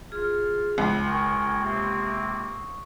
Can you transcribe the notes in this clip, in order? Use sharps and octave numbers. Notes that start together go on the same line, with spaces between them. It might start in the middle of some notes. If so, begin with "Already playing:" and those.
F4 G#4 F6
C#2
A#4 F5 G5 G#5 C#6 D#6
C3 A#3 C4